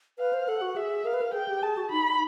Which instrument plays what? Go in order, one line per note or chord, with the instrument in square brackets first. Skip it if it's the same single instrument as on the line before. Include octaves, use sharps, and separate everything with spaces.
[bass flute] B4 [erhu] F5
[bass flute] C5
[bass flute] A4 [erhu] F#5
[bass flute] F#4
[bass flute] G#4 [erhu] E5
[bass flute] A#4 [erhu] F5
[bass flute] B4
A#4
[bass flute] G#4 [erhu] G5
[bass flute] G4
[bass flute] G#4 [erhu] A5
[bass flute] F#4
[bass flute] D#4 [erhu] B5